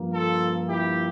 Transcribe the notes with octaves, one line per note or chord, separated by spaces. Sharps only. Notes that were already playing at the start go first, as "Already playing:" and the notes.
Already playing: G2 F3 A#3
F4 A4
E4 G4